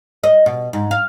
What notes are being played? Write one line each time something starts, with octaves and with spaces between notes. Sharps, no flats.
D#5
B2
G#2
F5